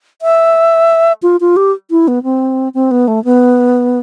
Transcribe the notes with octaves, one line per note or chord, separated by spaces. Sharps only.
E5
F4
F4
G4
E4
B3
C4
C4
B3
A3
B3